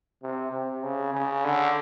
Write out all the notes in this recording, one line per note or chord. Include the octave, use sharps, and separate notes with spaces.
C3
C3
C#3
C#3
D3